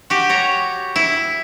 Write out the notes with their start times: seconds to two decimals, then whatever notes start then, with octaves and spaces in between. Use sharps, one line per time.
0.10 F#4 G4
0.29 C#5 A#5
0.96 E4